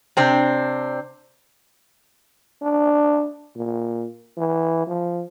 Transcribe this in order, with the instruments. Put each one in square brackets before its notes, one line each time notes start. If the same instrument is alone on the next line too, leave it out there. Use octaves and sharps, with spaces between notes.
[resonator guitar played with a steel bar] C3 C4 D4
[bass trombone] D4
A#2
E3
F3